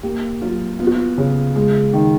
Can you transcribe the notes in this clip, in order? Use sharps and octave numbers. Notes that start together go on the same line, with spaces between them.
A#3 G4
F#3 F4
B3 F4
F#4
F4
C#3
G#3
D#3